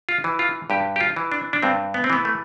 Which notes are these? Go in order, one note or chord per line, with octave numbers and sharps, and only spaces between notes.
F4
E3
F4
G2 G4
G4
F4
E3
D4
D4
G2 C4
B3
C4
E3 B3
A3